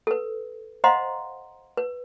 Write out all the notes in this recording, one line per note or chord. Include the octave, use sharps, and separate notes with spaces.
A4 B4
C5 D#5 F5 F#5 A#5 C6
B4